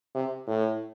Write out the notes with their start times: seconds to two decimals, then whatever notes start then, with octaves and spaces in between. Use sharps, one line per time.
0.15 C3
0.47 A2